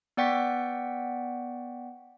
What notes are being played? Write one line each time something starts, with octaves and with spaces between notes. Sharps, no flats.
B3 D5 F#5 G5 C#6 B6